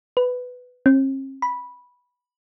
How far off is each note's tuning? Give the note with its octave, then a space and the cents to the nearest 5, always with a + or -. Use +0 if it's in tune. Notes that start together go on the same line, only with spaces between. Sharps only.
B4 +10
C4 +45
B5 -10